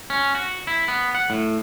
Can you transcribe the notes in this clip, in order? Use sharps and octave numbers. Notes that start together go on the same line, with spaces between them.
C#4
F#4
E4
B3
F#5
A2